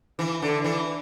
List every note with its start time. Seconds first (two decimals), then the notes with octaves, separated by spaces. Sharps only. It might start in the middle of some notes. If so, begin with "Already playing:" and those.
0.19 E3
0.42 D3
0.64 E3